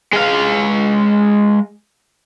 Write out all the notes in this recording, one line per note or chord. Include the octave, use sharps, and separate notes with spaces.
G#3 F5